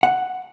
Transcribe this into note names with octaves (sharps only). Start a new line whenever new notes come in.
F#5